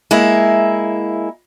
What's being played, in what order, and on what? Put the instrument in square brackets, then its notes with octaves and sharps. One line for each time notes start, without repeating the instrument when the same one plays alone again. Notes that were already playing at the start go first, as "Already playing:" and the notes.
[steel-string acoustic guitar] G#3 A#3 E4